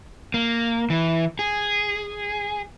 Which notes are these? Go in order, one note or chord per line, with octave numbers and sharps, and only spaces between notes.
A#3
E3
G#4